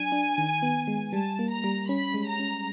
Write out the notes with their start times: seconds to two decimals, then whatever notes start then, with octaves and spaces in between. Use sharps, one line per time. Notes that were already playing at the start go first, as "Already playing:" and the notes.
Already playing: F#3 D4 G#5
0.12 D4
0.38 D#3
0.62 B3
0.87 G#3
1.13 G3 A5
1.39 A#3
1.51 A#5
1.64 G3
1.89 C#4 B5
2.14 G#3
2.26 A#5
2.39 C#4